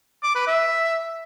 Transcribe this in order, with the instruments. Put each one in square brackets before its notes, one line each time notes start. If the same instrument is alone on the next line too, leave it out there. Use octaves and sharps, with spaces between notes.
[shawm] D6
B4
E5